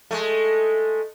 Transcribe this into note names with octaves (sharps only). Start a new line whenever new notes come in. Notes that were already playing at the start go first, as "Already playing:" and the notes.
G#3 A3